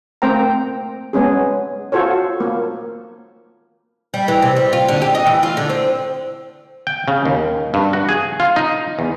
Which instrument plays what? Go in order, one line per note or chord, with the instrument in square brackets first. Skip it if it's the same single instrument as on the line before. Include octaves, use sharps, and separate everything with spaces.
[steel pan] A3 A#3 C4 C5 G5 A#5
G#3 B3 C#4 G#4
F4 F#4 A4 C5 C#5
A#3
[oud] G3
E3
C3
G3
F4
D3
G4
D#5
E3
F4
D3
C4
[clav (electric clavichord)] G5
C#3
D#2
G2
F#4
G#4
F4
D#4
E2